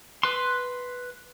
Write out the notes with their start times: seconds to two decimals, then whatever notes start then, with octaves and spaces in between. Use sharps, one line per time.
0.23 B4 C6